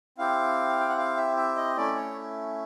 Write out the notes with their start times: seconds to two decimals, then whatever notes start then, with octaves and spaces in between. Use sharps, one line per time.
0.18 C4 E4 G4 F5
0.80 G5
0.89 F#5
0.97 F5
1.17 E5
1.37 E5
1.56 D#5
1.76 A3 C#4 E4 D5
1.96 C#5